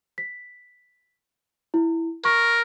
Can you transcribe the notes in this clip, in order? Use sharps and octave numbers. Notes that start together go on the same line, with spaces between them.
B6
E4
A#4 C#6